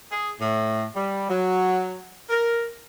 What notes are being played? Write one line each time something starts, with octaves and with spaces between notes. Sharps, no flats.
G#4
A2
G3
F#3
A#4